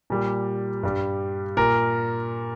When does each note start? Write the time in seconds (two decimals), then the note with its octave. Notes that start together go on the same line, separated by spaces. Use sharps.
0.10 A#2 G3
0.83 G2 G3
1.57 A#2 A#4